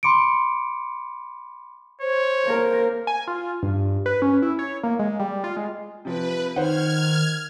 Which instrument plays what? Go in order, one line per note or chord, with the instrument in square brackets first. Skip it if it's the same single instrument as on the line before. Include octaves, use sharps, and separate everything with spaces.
[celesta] B5 C6 D6 C#7 D7
[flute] C5 [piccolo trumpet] C#5
[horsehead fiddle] A#3 A#4
[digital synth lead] G#5
F4
G2
B4
C#4
E4
C#5
A#3
G#3
G3
F4
G#3
[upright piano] C3 F3 [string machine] B4
[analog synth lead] D#3 [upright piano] C5 F#5 [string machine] F6 G#6